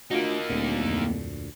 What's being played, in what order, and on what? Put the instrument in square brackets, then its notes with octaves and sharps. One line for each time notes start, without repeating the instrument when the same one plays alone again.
[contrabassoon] D2 [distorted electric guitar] A#3 D#4 [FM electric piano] F4 F#4
[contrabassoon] D1 [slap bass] D2 A#2
[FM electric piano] F2